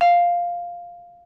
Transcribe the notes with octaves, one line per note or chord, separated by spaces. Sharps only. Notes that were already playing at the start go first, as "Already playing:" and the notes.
F5